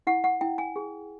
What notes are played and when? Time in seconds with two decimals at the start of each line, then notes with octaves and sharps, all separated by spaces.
0.07 E4 F#5
0.24 F#5
0.41 E4 G5
0.58 G#5
0.76 G#4